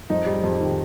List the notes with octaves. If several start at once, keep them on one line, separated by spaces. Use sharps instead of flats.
F2 D#4
G3
F2
D#3